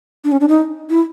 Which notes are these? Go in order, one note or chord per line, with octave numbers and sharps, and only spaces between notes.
D4
C#4
D4
D#4
E4